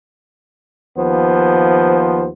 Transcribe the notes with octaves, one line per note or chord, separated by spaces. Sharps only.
D#2 F3 B3 C5